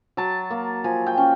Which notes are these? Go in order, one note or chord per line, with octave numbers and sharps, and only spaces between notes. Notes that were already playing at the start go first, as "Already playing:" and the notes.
F#3 A5
A#3
F3 G#5
G5
C#4